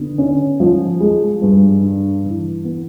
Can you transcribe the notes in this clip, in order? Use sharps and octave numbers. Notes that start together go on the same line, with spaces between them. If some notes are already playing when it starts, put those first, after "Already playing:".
Already playing: D3 B3
C#4
F3
G#3
G2
D4
E3
B3